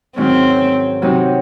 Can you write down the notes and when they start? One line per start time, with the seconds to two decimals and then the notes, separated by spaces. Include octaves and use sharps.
0.16 G#2 D#3 F#3 C4 C#4
1.02 C3 F#3 C4 D#4